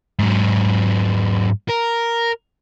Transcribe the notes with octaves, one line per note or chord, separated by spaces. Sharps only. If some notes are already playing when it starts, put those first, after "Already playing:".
G#2 F#3
A#4